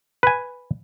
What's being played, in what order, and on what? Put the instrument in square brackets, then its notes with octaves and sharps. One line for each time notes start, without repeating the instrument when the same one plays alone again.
[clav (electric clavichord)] B4 G#5